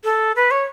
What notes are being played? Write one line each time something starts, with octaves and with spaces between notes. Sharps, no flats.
A4
B4
C#5